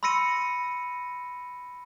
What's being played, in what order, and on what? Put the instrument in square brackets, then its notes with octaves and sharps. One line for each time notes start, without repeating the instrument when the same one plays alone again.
[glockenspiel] B5 C6 E6 A#6 C#7 D#7